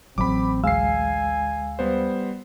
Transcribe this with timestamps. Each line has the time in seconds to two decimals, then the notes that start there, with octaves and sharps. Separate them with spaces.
0.18 A1 F#3 C4 B5 D6
0.64 D2 G#3 F5 G#5 E6 C7
1.79 G3 B3 C5